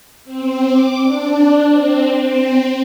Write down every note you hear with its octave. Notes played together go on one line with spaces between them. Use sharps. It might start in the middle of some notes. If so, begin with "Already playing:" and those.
C4
D6
D4
C4
C4